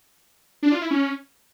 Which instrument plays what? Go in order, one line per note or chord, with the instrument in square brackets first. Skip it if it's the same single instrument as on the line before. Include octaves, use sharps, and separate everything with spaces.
[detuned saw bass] D4
F4
E4
C#4